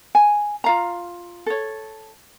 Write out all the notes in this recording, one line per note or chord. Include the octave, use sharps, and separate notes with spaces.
G#5
F4 F5 A#5
A4 C#5